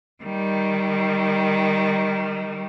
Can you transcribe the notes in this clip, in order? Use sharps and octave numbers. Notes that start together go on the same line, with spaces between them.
D#3 G3